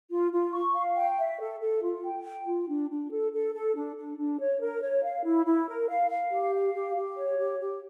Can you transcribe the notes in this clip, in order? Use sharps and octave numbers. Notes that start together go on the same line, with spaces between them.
F4
F4
C#6
F5
G5
E5
A4
A4
F4
G5
G5
F4
D4
D4
A4
A4
A4
D4
D4
D4
C#5
A#4
C#5
F5
E4
E4
A#4
F5
F5
G4
F5
G4
G4
C#5
G4
G4